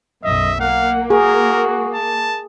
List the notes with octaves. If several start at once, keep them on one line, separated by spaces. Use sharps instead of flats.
B1 F#2 D#5 E5
A#3 F5 F#5
F#4 G#4 A#4
A5